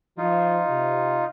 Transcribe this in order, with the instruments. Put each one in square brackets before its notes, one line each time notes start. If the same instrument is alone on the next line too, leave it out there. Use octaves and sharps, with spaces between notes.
[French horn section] F3 [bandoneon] D#4 F4
[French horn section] C3